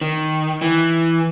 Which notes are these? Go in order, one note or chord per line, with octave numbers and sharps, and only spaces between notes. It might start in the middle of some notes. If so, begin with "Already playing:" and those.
D#3
E3